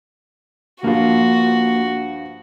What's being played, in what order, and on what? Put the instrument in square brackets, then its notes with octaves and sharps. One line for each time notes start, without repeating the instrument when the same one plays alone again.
[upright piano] G2 F3 [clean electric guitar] A#3 F4 [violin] F#4